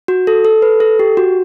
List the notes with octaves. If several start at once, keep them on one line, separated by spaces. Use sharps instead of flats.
F#4
A4
A4
B4
A4
G4
F#4